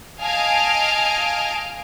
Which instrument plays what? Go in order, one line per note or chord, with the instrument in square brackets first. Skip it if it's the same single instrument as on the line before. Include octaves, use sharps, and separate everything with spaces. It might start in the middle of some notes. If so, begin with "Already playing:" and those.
[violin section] D#5 F5 G#5 A5 F6 D7